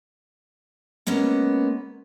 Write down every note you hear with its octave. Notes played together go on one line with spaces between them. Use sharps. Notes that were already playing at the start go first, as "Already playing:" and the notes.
G#3 A#3 B3 C#4